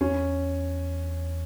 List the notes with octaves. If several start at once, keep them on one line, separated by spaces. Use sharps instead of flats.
E2 C#4